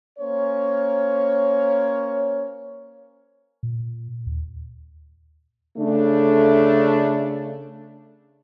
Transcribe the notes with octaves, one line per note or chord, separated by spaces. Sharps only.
A#3 C#4 C5 C#5
A#2
D#2
C#3 A3 D4